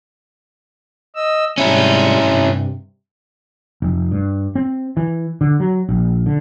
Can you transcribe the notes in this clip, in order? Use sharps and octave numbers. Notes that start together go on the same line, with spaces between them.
D#5 E6
G#2 C3 G3 C#4 E4
G2 C3
F1
G2
C4
E3
D3
F#3
A#1
D3